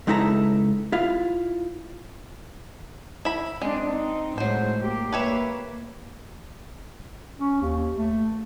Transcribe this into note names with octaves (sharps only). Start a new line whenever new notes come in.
C#2 G#3 D#4 E4 A4 A#5
E4 F4 F5
E4 B5
G#3 C4 D4
C4 D#4
A2 F#3 G#3 C5
A#3 G4
A#3 B4 C#5 E5
C#4
D#2
A3